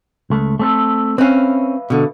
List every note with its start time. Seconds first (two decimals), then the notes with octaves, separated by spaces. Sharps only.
0.30 C#2 A3
0.59 A3 C4 A4
1.18 C4 C#4 B4 E5 F5
1.90 B2 D3